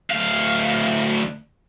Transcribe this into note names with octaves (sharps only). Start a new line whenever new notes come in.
D2 F5